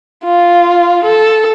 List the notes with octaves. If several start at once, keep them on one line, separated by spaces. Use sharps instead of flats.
F4
A4